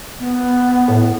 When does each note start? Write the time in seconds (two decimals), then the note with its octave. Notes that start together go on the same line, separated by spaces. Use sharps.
0.20 B3
0.88 A2